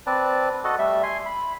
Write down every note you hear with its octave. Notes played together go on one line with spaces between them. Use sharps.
C4 B4 D5 A5
F#4 A4 D#5 F#5
G3 A3 E5
G#5 C6
B5